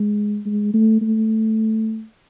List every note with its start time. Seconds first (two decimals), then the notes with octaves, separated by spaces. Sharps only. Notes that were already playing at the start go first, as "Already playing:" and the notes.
Already playing: G#3
0.46 G#3
0.74 A3
1.02 A3